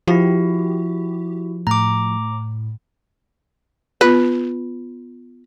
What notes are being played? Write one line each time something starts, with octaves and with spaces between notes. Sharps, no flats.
F3 E4 F#4 G4
A2 A#5 D6
B3 F4 B4